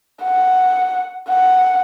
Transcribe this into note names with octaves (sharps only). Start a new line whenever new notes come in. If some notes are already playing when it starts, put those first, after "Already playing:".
F#5
F#5